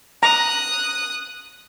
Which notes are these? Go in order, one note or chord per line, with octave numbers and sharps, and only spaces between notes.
A#5 D#6 F#6